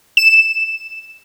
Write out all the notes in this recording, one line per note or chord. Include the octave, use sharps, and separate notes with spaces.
E7